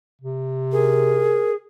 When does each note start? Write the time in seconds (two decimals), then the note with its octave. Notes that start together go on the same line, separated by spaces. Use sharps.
0.22 C3
0.72 G#4 A#4